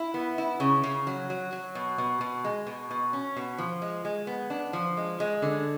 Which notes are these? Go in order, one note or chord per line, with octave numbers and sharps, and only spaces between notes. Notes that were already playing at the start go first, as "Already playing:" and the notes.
Already playing: E4
B3
E4
C#3
C#3
F#3
F#3
F#3
B2
B2
B2
G#3
B2
B2
C#4
B2
F3
G#3
G#3
B3
D4
F3
G#3
G#3
D3